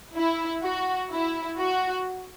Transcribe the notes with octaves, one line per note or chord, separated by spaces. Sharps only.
E4
F#4
E4
F#4